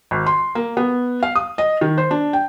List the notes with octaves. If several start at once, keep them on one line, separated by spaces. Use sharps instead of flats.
G#1
C6
A#3
B3
F5
D#6
D#5
D#3
C5
D4
G5